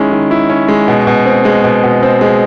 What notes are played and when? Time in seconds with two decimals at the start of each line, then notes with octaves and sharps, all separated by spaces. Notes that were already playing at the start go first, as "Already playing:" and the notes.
Already playing: D#3 G#3 C#4 E4
0.12 D#3
0.31 E4
0.49 C#4
0.68 G#3
0.88 B2
1.07 B2
1.26 C4
1.45 G#3
1.64 B2
1.83 B2
2.03 C4
2.21 G#3